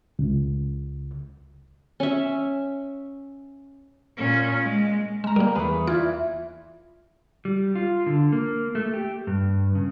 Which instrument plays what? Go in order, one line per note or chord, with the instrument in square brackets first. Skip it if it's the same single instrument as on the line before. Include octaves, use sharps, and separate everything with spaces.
[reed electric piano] C#2
[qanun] C#4 E5
[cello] A#2 C#4
G#3
[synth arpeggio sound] G#3 A#5
[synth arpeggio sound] G3 A#3 [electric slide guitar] A#4
[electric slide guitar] E2 B4 [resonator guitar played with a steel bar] A3 G#4
[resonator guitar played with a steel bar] E3 E4 D5 [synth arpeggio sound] F4
[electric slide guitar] G3
F4
D3
A#3
A3
G4
G2
C#3